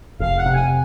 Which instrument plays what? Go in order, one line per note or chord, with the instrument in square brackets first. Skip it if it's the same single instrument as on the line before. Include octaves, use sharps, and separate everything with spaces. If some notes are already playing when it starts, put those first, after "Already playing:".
[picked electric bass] F1 [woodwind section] F5
[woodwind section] F#5
[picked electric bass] C3
[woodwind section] G#5